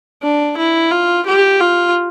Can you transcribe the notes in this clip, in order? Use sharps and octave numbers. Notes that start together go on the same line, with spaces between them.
D4
E4
F4
G4
F4